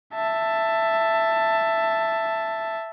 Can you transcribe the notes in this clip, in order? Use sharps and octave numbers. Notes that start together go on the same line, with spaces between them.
E5 A5